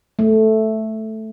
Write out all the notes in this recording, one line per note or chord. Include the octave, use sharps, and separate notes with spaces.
A3